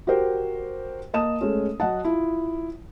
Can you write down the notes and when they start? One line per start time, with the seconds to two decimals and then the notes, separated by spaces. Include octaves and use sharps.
0.07 F#4 G4 A#4 C5 G5
1.14 A#3 D#5 A5 D#6 E7
1.41 G#3 A3 C#4
1.80 F#3 D#5 F#5 A5
2.05 E4 F4